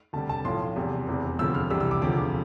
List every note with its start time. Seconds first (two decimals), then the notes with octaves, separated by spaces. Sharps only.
0.13 D2 C3 G3 A5
0.29 A5
0.45 B1 A2 F3 C6
0.76 E2 C3 G3
1.07 F1 E2 C3
1.39 E1 D2 C3 F3 E6
1.55 F6
1.70 C2 C3 E3 G3 E6
1.80 E6
1.91 D6
2.01 E1 D2 C3 F3 D6